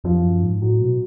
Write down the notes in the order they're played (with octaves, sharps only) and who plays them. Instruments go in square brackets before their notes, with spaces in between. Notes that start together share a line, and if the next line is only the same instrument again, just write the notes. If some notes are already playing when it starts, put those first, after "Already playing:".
[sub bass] F2 [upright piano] F3
[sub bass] F#2
G#2
[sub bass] A2 [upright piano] F#3
[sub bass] B2